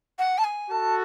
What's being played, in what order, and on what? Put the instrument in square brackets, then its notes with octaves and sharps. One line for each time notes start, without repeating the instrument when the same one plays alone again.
[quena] F#5
A5
G#5
[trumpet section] F#4 A4 [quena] A5